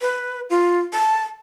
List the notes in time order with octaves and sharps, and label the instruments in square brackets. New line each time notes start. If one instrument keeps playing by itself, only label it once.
[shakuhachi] B4
F4
A5